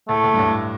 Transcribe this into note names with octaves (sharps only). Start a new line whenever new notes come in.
A2 A3
A2
G2
A2